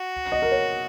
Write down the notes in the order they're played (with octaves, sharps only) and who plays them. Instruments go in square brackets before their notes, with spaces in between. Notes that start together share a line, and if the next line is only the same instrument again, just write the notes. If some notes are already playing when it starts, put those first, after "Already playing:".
Already playing: [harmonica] F#4
[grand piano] D#5
A#4
C#5